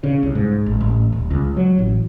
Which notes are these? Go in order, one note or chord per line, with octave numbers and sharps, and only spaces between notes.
C#3
C2
G#2
A1
A1
D#1
C#2
F#3
A1